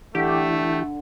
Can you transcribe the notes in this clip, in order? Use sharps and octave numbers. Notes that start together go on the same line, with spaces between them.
D3 E3 A3 E4 G4 G5